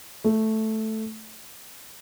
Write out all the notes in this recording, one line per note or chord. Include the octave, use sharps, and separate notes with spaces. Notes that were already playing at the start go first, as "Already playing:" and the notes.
A3